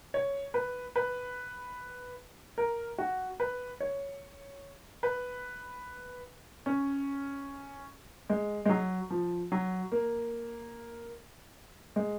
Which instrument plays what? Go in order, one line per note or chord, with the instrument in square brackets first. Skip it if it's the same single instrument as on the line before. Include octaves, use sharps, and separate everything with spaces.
[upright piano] C#5
B4
B4
A#4
F#4
B4
C#5
B4
C#4
G#3
G#3
F#3
F3
F#3
A#3
G#3